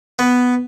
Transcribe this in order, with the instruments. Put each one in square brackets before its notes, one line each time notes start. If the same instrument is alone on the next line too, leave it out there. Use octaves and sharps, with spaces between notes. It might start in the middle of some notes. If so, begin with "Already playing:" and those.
[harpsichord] B3